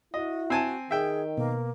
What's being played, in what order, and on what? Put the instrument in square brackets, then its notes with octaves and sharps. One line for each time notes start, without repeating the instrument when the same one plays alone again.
[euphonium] E4 [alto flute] F#4 [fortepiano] D#5
[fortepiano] C4 G#5 A5
[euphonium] D#3 [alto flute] G#4 [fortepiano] E5 G5
[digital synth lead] B2 [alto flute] A#3